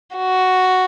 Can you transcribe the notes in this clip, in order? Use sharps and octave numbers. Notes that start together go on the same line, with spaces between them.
F#4